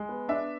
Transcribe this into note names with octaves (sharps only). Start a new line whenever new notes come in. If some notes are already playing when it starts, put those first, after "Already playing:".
Already playing: G#3
B3
D4 E5